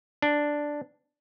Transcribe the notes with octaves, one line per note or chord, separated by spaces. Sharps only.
D4